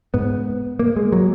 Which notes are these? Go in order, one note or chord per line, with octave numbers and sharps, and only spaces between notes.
G#2 B3
A#3
G#3
F#3